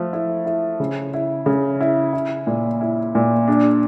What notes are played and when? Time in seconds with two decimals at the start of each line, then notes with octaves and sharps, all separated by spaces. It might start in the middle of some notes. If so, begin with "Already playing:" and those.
Already playing: F3 A3
0.13 E4
0.46 E4
0.80 C#3
1.14 E4
1.46 C#3
1.81 E4
2.13 E4
2.47 A#2
2.81 E4
3.15 A#2
3.48 D4